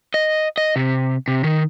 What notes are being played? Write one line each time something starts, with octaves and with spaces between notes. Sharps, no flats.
D#5
D#5
C3
C3
D#3